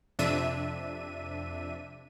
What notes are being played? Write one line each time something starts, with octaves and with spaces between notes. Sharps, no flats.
F2 C3 D4 E5 D#7